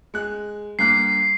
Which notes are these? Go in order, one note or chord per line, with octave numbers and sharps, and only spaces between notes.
G#3 F#6
G2 A#3 F#6 C7